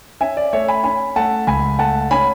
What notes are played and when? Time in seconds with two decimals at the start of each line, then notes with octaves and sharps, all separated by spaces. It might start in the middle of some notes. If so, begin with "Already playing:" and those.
0.21 C#4 E5 G#5
0.37 D5
0.53 A3 C#5 E5
0.68 G#5 B5
0.84 C#4 G#5 B5
1.16 A3 F#5 A5
1.47 C#2 G#5 B5
1.79 A3 F#5 A5
2.11 C#4 G#5 B5